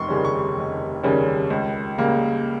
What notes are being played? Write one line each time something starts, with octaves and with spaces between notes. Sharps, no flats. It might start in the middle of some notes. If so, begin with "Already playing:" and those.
Already playing: F1 C6 C#6
D#2 C#3 G3 C#4
C#6
F1
D#2 C#3 G3 C#4
C#2
C#3 G3 A#3